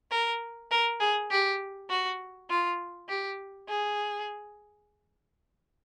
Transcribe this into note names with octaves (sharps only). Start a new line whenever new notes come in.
A#4
A#4
G#4
G4
F#4
F4
G4
G#4